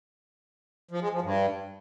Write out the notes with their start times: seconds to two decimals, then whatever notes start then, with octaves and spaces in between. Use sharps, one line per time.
0.91 F3
1.02 G#3
1.12 F3
1.23 G2